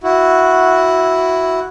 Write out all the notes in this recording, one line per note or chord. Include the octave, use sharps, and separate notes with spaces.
E4 F#4